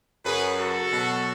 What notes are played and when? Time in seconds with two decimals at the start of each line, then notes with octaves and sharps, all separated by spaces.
0.25 F#2 C#3 F#3 G#4 B4
0.58 F#4 A4
0.91 B2 F#3